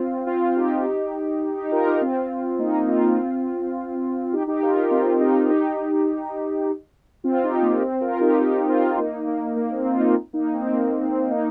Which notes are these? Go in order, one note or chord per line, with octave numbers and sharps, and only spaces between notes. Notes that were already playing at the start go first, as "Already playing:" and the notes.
Already playing: C4 F4
C4 F4
D#4 G4
D#4 G4
F4 A#4
D#4 G4
C4 F4
A#3 D#4
C4 F4
D#4 G4
D#4 G4
F4 A#4
D#4 G4
C4 F4
D#4 G4
D#4 G4
C4 F4
D#4 G4
A#3
C4
F4 A#4
D#4 G4
D#4 G4
C4 F4
A#3 D#4
A#3
A#3
C4
C4 F4
A#3 D#4
A#3 D#4
C4
A#3
C4
A#3 D#4